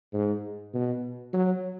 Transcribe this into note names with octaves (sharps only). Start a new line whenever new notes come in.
G#2
B2
F#3